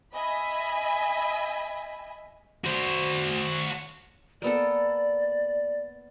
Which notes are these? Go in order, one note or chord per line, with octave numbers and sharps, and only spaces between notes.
D#5 E5 G#5 B5
F#4 C5
A#3 B3 A4 D5